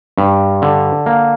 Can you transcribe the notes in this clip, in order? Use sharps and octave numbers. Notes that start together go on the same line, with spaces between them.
G2
D3
A#3